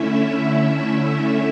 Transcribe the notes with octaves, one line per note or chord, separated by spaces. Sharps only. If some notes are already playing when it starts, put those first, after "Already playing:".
Already playing: D3 A3 C#4 E4 E5